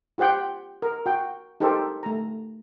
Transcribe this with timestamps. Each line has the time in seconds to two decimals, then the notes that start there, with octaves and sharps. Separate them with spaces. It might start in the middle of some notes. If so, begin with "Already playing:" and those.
0.18 F4 G4 C5 F#5 G5
0.82 A#4
1.06 F#4 G5
1.60 D#4 G4 A4 A#4 C5
2.03 A3 A#5